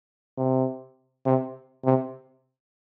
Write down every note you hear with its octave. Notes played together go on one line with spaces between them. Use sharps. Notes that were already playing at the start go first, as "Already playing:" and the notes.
C3
C3
C3